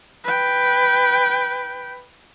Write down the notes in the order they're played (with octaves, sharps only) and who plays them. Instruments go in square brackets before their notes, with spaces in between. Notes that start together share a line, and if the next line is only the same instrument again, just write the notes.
[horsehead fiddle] B4 G5